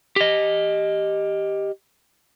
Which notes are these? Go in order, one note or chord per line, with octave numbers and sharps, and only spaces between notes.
G4 D#5